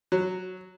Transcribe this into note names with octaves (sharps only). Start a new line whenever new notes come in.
F#3